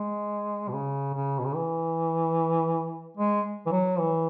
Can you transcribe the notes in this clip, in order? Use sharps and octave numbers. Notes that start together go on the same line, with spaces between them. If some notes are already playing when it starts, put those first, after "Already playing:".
Already playing: G#3
B2
C#3
C#3
B2
C#3
E3
G#3
E3
F#3
E3